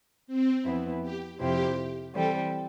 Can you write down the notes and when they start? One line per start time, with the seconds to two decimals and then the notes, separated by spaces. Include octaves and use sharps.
0.27 C4
0.64 F2 E3 B3 E4
1.02 G4
1.39 F2 C3 F3 C4 E4 G4
2.13 E3 G3 C4 A4